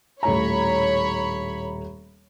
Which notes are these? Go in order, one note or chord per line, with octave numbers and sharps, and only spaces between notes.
D#1 A2 C#5 A#5 B5